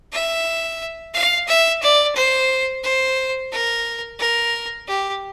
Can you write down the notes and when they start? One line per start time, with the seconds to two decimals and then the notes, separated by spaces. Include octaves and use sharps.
0.12 E5
1.14 F5
1.48 E5
1.82 D5
2.16 C5
2.83 C5
3.52 A#4
4.19 A#4
4.88 G4